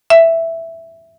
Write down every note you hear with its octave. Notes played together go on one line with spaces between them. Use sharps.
E5